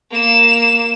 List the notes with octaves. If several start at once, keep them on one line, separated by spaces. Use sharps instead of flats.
A#3 E7